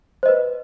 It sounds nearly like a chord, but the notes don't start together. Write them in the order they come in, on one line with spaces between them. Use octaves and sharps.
C5 D#5 B4